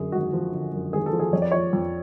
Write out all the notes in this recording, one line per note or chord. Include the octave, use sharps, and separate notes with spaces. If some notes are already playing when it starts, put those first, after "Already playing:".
Already playing: F#2 D3 G#4
G#1 F#4
F3
D3
F#2
G#1 G#4
A4
F3
G#4
F2 C#5
D5
F3 C#5
F2